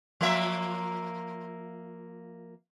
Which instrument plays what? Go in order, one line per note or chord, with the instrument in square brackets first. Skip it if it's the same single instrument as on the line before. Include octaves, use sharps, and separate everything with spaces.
[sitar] F3 A#3 E5